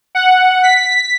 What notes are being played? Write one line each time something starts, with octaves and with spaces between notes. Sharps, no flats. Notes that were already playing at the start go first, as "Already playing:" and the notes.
F#5
B6